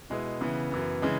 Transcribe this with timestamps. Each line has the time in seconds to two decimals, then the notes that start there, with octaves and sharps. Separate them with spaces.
0.10 B2 G#3 B3 E4
0.41 C#3 E3 B3 E4
0.72 F#2 E3 B3
1.02 C#3 E3 G#3